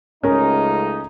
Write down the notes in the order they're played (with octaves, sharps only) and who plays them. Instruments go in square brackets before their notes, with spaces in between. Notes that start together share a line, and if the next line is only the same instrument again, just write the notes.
[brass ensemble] C#2 A3 D#4 [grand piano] C#4 A#4